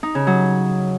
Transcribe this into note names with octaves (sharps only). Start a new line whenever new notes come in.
D#4
C#3
F#3